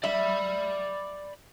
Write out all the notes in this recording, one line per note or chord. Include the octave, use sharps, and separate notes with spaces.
D5 E5 B5